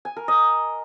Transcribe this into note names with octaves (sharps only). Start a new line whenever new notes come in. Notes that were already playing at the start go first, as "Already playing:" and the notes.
G#5
A#4
D#5